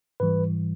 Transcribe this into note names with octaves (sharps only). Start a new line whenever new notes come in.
G#2 E3 G3 B4